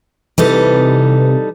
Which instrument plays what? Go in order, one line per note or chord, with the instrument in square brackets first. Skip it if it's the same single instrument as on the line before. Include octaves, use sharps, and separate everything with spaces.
[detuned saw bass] C3 [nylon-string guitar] E3 [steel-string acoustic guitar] G3 D#4 A4